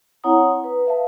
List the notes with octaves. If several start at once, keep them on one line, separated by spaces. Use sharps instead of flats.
C4 E4 C#5 F#5 A#5 D#6
B4
B4 E5 F5 A5